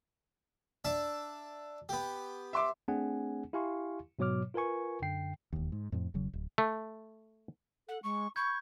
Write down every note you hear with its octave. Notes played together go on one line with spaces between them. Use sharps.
D4 E5 A5
B3 G4
E5 C6 D6
A3 C4 D4 G#4 F#5 G#5
E4 G4 F5 G#5 C6 C#6
G#2 B2 F#3 C#5 D6 F6
F4 A#4 B4 G#5 C#6
F#2 D3 G5 C7
E1 D#2
G#2
F2 A2 F3
E1 C#3 F#3
D1
A3
A4 F#5
G#3 C#6
B5 C#6 G6 G#6